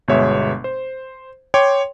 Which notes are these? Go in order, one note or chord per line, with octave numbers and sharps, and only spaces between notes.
G1 B2 G#3 C#5 E5
C5
C#5 G5 C6 D6